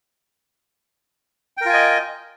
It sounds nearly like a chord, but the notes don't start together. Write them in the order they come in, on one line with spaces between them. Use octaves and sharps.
G5 A#4 F4 G#5 D#5